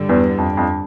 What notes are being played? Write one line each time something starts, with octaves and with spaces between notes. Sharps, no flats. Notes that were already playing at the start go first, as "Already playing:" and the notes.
Already playing: G2 D3 G3
E2
F2
F2